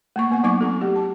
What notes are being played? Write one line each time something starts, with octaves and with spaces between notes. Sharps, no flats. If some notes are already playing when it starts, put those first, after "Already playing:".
A3 A#3 C#6
A#3 B3 F#5
F#3 B3 D#4 C#6 D6
C4 F#4 A4
A3 G4
A5